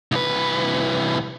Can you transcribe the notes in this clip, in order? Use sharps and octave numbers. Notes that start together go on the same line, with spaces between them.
C2 B4